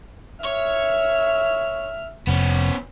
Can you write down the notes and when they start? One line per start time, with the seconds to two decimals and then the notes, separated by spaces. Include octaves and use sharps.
0.44 C#5 E5 F6
2.27 F1 B3 C#4